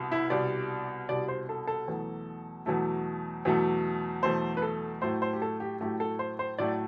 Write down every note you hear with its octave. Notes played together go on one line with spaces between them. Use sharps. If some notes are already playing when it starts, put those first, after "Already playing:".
Already playing: C2 B2
E4
C2 B2 G3 D5
C2 B2 G3 D5
C5
A4
A4
E2 B2 F#3 A3
E2 B2 F#3 A3
E2 B2 F#3 A3
E2 B2 F#3 A3 C5
B4
A4
A2 F#3 A3 C5
C5
G4
A4
G4
A2 F#3 A3 G4
A4
C5
C5
A2 F#3 A3 D5